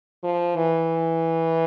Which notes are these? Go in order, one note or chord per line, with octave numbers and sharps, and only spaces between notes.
F3
E3